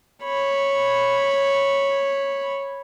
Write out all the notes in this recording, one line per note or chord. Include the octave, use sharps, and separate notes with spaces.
C#5 B5